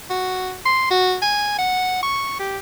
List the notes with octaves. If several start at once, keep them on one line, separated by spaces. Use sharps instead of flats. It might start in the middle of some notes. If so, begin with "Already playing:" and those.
F#4
C6
F#4
G#5
F#5
C#6
G4